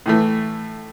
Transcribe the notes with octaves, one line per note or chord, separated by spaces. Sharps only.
A2 E3 A3